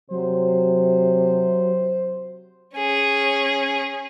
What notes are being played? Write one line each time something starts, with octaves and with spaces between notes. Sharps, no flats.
C3 F#3 C5
C#4 G#4